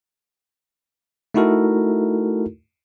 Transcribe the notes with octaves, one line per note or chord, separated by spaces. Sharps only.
A3 D#4 E4 F#4 A4 A#4